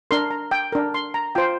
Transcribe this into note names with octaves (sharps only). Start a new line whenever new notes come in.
D4 A#4 C6
A#5
G5
D4 A#4
C6
A#5
F4 C5 G5